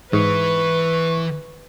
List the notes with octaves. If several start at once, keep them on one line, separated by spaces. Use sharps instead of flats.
G#2 E3 B4 C#6